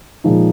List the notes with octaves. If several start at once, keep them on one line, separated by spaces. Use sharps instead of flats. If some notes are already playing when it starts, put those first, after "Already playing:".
A#2 F3 G#3 D#4